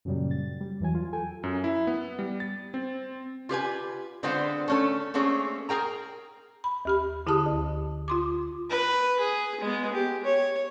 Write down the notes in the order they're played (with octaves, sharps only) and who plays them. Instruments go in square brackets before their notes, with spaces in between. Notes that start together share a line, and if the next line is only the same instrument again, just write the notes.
[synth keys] F#2 A#2 C#3 F#3 G3
A6
G3
E2 E3 F#3 G#5
F4
A4 G5 G#5
[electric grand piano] F#2
E4
B3
G3
A6
C4
[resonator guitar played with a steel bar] F4 G4 B4 G#5
D3 G#3 B3 C4 F4 C5
A3 C#4 A4
A3 A#3 C4 C#4 G#4
G#4 A#4 G5 A#5
[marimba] B5
D#2 G4 B5
D3 E4 G4 G#4 A5 D#6
D2
F4 C6 D6
[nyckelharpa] B4
G#4
G#3 B3
G4
C#5